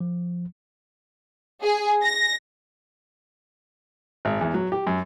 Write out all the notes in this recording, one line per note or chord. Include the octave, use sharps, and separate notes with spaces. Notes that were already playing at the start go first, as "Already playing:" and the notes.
F3
G#4
A#6
G#1
E2
F#3
G4
F#2